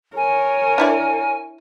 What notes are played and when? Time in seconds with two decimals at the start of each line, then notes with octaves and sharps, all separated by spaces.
0.16 A#4 C#5 G#5
0.78 D4 E4 D5